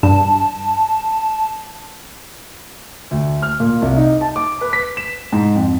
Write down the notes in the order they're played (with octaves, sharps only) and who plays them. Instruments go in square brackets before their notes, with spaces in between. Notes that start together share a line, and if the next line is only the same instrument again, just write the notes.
[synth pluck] G2 [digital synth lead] A5
[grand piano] D2
F6
A#2
C2
D#4
A5
D6
B4
B6
E7
G#2
F2